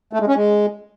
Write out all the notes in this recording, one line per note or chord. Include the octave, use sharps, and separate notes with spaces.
A3
G#3
C#4
G#3